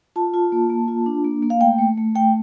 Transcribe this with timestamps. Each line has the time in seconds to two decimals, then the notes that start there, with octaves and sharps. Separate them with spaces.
0.16 F4 A5
0.34 F4
0.52 A#3
0.70 A#3
0.88 F4
1.06 D4
1.24 A#3
1.42 A#3
1.50 F5
1.60 A3 G5
1.78 A3
1.97 A3
2.15 A3 G5